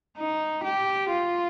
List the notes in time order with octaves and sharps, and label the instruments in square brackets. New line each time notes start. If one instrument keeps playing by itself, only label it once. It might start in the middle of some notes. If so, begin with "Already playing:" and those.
[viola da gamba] D#4
G4
F4